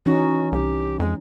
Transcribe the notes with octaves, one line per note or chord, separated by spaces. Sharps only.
E3 C#4 D#4 F#4
C2 G4
F2 G#3